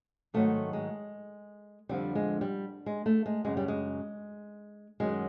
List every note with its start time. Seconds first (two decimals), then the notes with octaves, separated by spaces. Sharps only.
0.34 G#2 D#3 F#3 A3
0.73 G#3
1.89 F2 D3 F3 G3
2.15 G#3
2.41 G3
2.86 G#3
3.06 A3
3.26 G#3
3.45 F#2 C#3 F#3 G#3
3.57 G3
3.68 G#3
5.00 F#2 D#3 F#3 G#3